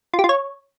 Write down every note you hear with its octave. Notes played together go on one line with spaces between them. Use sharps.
F4
G4
F4
C#5